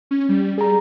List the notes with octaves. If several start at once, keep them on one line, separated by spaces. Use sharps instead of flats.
C#4
G3
G3 G#4 A#5